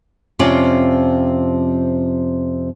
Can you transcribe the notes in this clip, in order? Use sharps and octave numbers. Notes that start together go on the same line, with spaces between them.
F2 C3 F3 C4 C#4 D5